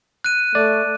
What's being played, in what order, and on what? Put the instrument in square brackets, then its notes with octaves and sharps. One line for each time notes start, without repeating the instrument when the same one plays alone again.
[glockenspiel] F#6 D#7
[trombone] A3 [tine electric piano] D5